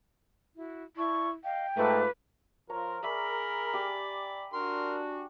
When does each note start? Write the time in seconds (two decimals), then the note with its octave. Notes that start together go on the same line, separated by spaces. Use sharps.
0.56 E4 F#4
0.97 E4 D5 A5 C#6
1.44 D#5 F5 G5
1.77 G#2 A3 F4 B4 A5 D6
2.70 F3 F4 A#4 C#5 A#5
3.03 G#4 A#4 D5 E5 B5 C#6
3.73 G4 D5 G#5
4.53 D4 F#4 A#4 C6